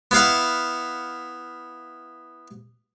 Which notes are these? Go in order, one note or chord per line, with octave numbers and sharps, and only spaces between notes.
B3 E4 F5 F#5